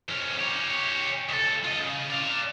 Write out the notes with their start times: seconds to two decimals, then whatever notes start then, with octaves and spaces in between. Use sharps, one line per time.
0.08 F2 C#4
0.39 G4 C#5
1.29 C#2 A4
1.64 F4 D#5
1.79 C#3
2.10 D5 F5